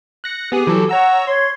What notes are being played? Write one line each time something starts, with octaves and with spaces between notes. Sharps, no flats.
F#6 A#6 C#7
B3 G4 G#4 D#6
E3 F#3 A4
C#5 F#5 A#5 E6
C#5 C6